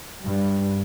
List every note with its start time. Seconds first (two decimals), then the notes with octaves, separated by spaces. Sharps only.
0.23 G2